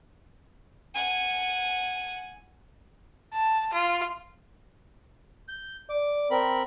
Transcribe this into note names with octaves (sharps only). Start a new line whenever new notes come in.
F#5 G#5
A5
F4
G6
D5 D6
C4 A#4 B5